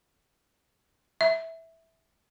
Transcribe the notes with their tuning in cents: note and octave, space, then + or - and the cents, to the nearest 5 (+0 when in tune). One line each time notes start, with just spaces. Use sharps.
E5 -10